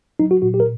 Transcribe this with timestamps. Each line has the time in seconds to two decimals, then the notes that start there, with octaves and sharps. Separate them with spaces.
0.19 F#3 D#4
0.31 F#4
0.42 A#2 F#4
0.54 G4
0.60 A#4